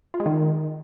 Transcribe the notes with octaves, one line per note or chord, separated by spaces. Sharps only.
F4
G#3
D#3